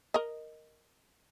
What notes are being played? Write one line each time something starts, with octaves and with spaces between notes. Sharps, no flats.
A#4 D#5